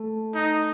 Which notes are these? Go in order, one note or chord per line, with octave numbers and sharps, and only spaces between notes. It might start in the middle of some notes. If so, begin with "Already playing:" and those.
Already playing: A3
D#4